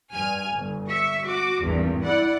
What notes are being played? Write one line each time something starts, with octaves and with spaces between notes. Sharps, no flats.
G2 G#5 F6
G1
E5 C#6
F#4 D6
G#1 E2 G2
E4 D5 F#5